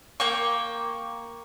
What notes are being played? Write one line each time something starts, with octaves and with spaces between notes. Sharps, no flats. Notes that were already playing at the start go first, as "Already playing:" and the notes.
A#3 G5 C#6